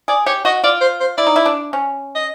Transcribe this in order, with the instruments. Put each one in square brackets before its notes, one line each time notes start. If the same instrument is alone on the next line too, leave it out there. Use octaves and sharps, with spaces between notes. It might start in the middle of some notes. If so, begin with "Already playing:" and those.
[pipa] G#4 [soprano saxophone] D5
[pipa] G4 [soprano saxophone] C#5
[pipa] F#4 [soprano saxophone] D#5
[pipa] F4 [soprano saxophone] D5
[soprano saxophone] C5
C5
[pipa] E4 [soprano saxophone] D5
[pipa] D#4
E4
D4
C#4
[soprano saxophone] D#5